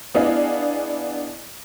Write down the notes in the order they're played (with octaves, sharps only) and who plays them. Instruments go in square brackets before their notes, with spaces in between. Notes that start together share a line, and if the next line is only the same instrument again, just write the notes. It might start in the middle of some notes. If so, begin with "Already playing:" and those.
[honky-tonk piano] B3 D4 E4 G#4 D#5 F5